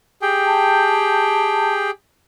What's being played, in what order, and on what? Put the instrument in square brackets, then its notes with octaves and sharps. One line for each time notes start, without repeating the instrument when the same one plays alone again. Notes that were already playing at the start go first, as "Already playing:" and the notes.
[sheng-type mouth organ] G4 G#4 G5
[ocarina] A5